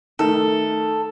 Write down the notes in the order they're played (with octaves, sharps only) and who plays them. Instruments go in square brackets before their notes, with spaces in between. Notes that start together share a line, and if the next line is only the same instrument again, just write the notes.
[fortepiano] D#3 A3 [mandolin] A4